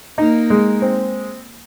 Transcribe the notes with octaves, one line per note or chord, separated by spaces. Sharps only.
A#3 D#4
G#3
C4